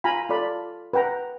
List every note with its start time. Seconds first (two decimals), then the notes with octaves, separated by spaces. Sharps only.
0.04 F4 F5 G#5 A#5 B5
0.30 F4 A4 D5 B5
0.93 B4 F#5 G5 A#5